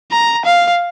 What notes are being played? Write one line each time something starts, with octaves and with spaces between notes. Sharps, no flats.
A#5
F5